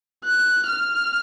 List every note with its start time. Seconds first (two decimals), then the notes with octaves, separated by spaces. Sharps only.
0.25 F#6
0.67 F6